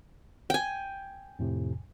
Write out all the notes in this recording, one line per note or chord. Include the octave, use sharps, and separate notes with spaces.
G5 G#5
F2 A2 C3